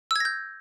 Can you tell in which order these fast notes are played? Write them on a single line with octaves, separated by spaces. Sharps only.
E6 G#6 A#6 G6